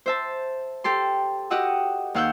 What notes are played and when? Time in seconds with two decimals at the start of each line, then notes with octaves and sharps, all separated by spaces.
0.06 C5 E5 A5
0.84 G4 A4 C6
1.50 F#4 G4 D#5 F#5 D#6 E6
2.14 D#2 F5 F#5 E6 F6 G6